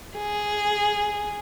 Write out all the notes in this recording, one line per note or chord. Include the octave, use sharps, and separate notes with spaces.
G#4